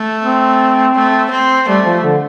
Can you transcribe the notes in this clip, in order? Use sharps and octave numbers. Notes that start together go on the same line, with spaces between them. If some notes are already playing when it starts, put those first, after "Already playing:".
Already playing: A3
C4
A3
C4
G3 A3
F3
D3